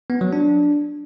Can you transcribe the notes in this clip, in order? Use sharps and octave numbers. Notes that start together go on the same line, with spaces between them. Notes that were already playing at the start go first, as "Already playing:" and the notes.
B3
F#3
D4